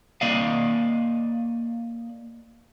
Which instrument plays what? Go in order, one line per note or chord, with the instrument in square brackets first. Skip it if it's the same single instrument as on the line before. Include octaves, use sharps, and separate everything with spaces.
[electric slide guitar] A#3 D5 D#5 F5